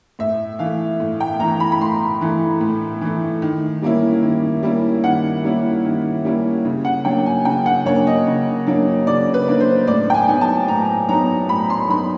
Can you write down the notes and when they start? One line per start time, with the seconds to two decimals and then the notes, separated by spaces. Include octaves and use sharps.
0.19 A2 E5
0.59 E3 A3 F5
1.00 A2
1.20 G5
1.40 E3 A3 A#5
1.60 B5
1.72 B5
1.81 A2 C6
2.21 E3 A3
2.61 A2
3.01 E3 A3
3.42 D#3
3.82 G3 A#3 C#4 E4
4.23 D#3
4.63 G3 A#3 C#4 E4
5.04 D#3 F#5
5.44 G3 A#3 C#4 E4
5.85 D#3
6.25 G3 A#3 C#4 E4
6.65 C#3
6.85 F#5
7.05 F#3 A#3 D4 G5
7.26 G#5
7.45 C#3 G5
7.66 F#5
7.86 F#3 A#3 D4 C#5
8.07 D#5
8.27 C#3
8.67 F#3 A#3 D4
9.07 C#3 D5
9.34 B4
9.47 F#3 A#3 D4
9.60 C5
9.87 A2 D5
10.10 G5
10.14 G#5
10.28 F#3 B3 D#4
10.41 A5
10.68 A2 A#5
11.09 F#3 B3 D#4 A#5
11.49 A2 B5
11.70 C6
11.89 F#3 B3 D#4 B5